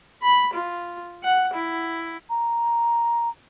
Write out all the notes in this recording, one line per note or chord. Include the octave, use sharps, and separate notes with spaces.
B5
F4
F#5
E4
A#5